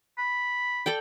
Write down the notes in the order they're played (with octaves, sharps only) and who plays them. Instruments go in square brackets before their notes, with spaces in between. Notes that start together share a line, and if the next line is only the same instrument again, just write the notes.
[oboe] B5
[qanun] A4 D5 G5